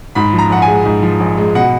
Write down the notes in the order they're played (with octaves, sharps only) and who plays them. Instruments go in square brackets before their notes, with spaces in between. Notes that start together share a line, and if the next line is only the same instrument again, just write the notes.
[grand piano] G#2 B5
F3
A#5
A#1 F#5
G#5
G#3
G#2
F3
A#1
G#3
B2 F#5